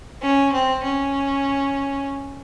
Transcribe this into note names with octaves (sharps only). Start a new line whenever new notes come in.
C#4
C4
C#4